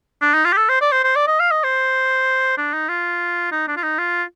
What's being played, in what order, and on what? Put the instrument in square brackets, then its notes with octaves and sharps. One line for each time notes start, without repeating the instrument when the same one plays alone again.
[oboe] D4
D#4
F4
G4
A4
C5
D5
C5
C5
D5
D#5
F5
D#5
C5
D4
D#4
F4
D#4
D4
F4
D#4
F4